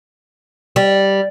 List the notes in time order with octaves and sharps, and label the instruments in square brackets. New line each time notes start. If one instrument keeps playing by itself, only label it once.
[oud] G3